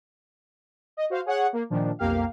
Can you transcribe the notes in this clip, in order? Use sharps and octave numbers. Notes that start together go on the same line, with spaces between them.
D#5
F#4 C5 F5
G#4 C#5 F#5
A#3
A#2 D#3 F3 D4
B1 F2 A#3 G4 F5